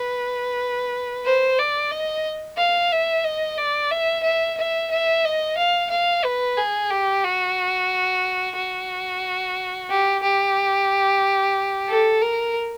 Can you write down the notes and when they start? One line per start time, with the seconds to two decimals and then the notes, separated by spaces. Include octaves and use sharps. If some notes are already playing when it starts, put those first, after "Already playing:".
Already playing: B4
1.25 C5
1.59 D5
1.91 D#5
2.58 F5
2.92 E5
3.25 D#5
3.58 D5
3.91 E5
4.24 E5
4.58 E5
4.91 E5
5.25 D#5
5.58 F5
5.90 F5
6.24 B4
6.57 G#4
6.90 G4
7.24 F#4
8.56 F#4
9.90 G4
10.23 G4
11.88 A4
12.21 A#4